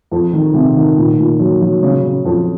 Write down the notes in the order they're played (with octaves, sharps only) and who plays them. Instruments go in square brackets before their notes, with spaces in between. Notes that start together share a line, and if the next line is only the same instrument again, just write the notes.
[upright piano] F2
D#3
C3
D#3
A#2
A#2
F#3
F#3
C#3
C#3
F2